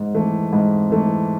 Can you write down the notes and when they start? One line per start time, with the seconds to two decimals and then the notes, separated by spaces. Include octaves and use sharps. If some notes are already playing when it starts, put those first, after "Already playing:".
Already playing: G#2
0.14 E3 A3
0.53 G#2
0.90 E3 A3